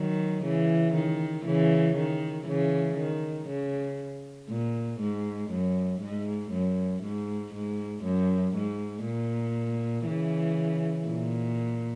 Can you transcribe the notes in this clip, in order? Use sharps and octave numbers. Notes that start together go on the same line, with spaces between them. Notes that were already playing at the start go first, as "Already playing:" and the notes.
Already playing: D#3 F#3
C#3 E3
D#3
C#3 E3
D#3
C#3 E3
D#3
C#3
A#2
G#2
F#2
G#2
F#2
G#2
G#2
F#2
G#2
A#2
C#3 E3
A#2